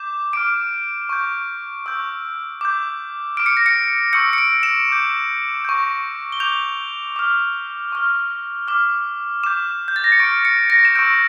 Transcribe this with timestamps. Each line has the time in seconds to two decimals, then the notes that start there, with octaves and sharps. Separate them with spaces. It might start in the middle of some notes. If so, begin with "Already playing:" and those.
Already playing: D6 G6 E7
0.33 D6 F6 D7
1.09 C#6 G6
1.86 C#6 E6 G6
2.61 D6 G6
3.37 D6 F6 D7
3.46 C#7
3.57 A#6
3.66 C#7
4.12 C#6 E6 G6 C#7
4.33 C#7
4.38 D7
4.63 E7
4.89 D6 G6
5.65 C#6 G6
6.32 G7
6.40 D6 G6 F7
7.16 D6 F6
7.92 C#6 F6
8.68 D6 F6
9.44 D6 G6 E7
9.88 G6
9.96 A6
10.04 A#6
10.12 C#7
10.19 C#6 F6 D7
10.45 C#7
10.70 A#6
10.85 E7
10.95 C#6 E6 G6 D7